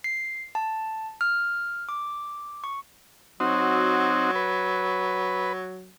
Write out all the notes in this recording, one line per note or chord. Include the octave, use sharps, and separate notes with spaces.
C7
A5
F6
D6
C#6
F#3 C4 D#4 F#4
B4